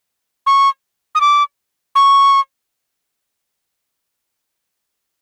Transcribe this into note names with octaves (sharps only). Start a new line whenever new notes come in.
C#6
D#6
D6
C#6